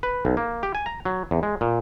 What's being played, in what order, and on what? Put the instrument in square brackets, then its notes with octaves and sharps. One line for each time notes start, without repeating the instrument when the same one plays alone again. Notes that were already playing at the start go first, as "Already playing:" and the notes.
[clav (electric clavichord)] B4
B1
A#3
G4
G#5
A#5
F#3
E2
G#3
A#2